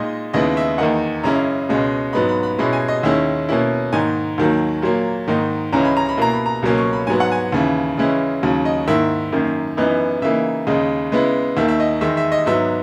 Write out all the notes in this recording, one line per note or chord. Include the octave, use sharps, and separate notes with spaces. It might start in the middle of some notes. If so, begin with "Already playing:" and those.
Already playing: A#2 G#3 D#4 D#5
D#2 C#3 G#3 B3 E4 D#5
E5
E2 D#3 A#3 D#4 F#5
F#2 C#3 G#3 C#4 E4 A#5
C#2 B2 G#3 C#4
G#2 F#3 B3 D#4 B5
B5
B5
B2 G#3 C#4 E4 B5
G#5
D#5
D#2 D#3 G#3 C#4 E4 E5
B2 A#3 C#4 E4
G#2 D#3 A#3 D#4 G#5
D#2 D#3 F#3 A#3
A#2 F#3 A#3
G#2 D#3 A#3 D#4
C#2 C#3 E3 G#3 C#4 A#5
B5
A#5
B5
B2 A#3 E4 A#5
B5
A#5
C#2 B2 F#3 A#3 C#4
C#6
B5
G#2 F#3 B3 G#5
F#5
G#5
D#2 C#3 E3
C#3 E3 G#3 C#4 E4
D#2 C#3 F#3
D#5
G#2 D#3 A#3 E4 E5
F#2 D#3 A#3
F#2 E3 B3 D#4
C#3 E3 A#3 D#4 E5
D#2 C#3 G#3 D#4
C#3 G#3 B3 E4
D#2 D#3 A#3 E5
E5
D#5
E2 D#3 G#3 E5
E5
D#5
G#2 F#3 B3 D#4 E5